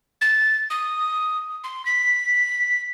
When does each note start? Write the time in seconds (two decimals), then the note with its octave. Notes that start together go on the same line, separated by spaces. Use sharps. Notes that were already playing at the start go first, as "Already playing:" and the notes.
0.21 A6
0.70 D#6
1.64 C6
1.86 B6